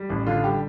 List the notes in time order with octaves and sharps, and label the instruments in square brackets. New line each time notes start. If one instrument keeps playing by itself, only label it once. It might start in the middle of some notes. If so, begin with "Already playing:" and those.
Already playing: [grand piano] G3
A1
D3 F4
G3 G4